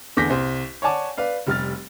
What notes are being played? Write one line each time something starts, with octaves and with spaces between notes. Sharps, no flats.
E2 D3 D6 G6 A#6 B6
C2 C5
C#5 D5 F#5 G#5 A5 D6
B4 D5 F5
F1 G3 F6 A6